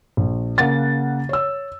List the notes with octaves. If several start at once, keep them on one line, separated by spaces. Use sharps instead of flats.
A#1
C#3 A#3 F#5 A6
C#5 E6